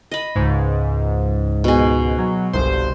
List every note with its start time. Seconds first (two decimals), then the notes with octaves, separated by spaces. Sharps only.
0.11 D#5 B5
0.36 C#2 G#2
1.64 B2 G#4
2.19 F#3
2.53 G1 C2 C5